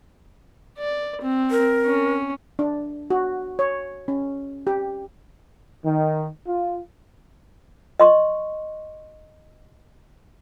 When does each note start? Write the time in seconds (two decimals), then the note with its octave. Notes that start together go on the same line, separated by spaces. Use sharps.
0.78 D5
1.21 C4
1.51 A#4
1.86 C#4
2.59 D4
3.10 F#4
3.59 C#5
4.08 C#4
4.67 G4
5.85 D#3
6.48 F4
8.00 D#5 C6 C#6